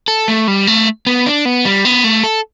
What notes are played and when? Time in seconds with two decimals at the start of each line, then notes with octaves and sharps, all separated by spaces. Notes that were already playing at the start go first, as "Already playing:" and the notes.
0.08 A4
0.28 A3
0.48 G3
0.67 A3
1.07 B3
1.26 D4
1.45 B3
1.65 G3
1.85 B3
2.04 A3
2.24 A4